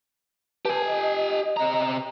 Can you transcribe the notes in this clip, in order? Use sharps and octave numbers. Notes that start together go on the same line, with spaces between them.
G4 B4 G#5 A5
D#5
C3 A#5